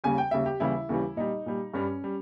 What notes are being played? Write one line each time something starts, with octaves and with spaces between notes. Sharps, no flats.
D#2 C#3 G3 G#5
G5
D#2 C#3 G3 E5
G4
D#2 C#3 E3 G3 E4
D#2 C#3 E3 G3
A#2 G3 D#4
A#2 G3
G2 G3 C#4
G3